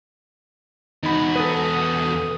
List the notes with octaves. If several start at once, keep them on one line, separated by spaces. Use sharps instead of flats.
E2 D#4 F#4 B5
A4 B4 D#6 D#7